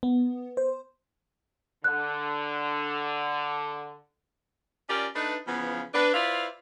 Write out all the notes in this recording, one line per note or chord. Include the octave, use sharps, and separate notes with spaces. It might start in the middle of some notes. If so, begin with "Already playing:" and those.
B3
C5
D3 F#6
C#4 F4 G4 A#4 D5
A3 D4 D#4 B4
C#3 E3 F3 B3
D4 B4
E4 F4 B4 C5 D5 F5